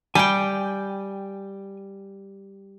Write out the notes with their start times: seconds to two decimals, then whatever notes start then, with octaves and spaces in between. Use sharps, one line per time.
0.15 G3 G5 G#5